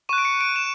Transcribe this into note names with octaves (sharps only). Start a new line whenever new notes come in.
C#6 F#6 D#7
D7
C#7
D7
E7